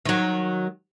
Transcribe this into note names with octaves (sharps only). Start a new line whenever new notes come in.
D#3 F#3